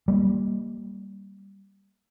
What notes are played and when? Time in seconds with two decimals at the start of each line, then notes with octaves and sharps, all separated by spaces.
0.08 G3 A#3